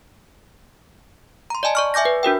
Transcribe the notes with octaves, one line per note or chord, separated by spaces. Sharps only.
A#5 C6
D5 D#5 G#5 A5
D5 C#6 F6
E5 G#5 D6 G6 A#6
B4
D4 F#4 A#4 G5